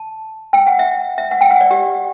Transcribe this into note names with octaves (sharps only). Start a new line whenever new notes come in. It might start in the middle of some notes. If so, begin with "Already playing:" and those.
Already playing: A5
G5
F#5
E5
E5
F#5
G5
F#5
D5
G4